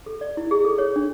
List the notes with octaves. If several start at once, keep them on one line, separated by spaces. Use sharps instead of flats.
A4
D5
E4
G#4
A4
C#5
D4